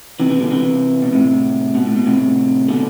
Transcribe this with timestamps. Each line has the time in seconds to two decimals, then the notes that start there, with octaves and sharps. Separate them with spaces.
0.20 C3 E3
0.30 C3 E3
0.40 B2 D3
0.51 C3 E3
1.02 B2
1.13 A2 C3
1.75 B2
1.86 A2
1.96 B2
2.06 A2 C3
2.68 B2 D3